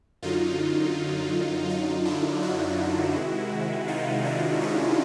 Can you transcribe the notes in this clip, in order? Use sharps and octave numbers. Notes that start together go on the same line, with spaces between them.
F#2 D3 F#3 D#4 F4
D#4 F4
D4 E4
E4 F#4
C3 D#3 G#3
D#4 F4
D4 E4
C#4 D#4